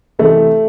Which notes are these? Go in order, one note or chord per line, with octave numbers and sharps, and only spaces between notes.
C2 C3 E3 A3